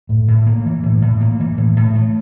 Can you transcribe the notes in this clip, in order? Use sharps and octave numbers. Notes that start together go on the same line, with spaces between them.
A2
A2
A#3
E3
A2
A2
A#3
E3
A2
A2
A3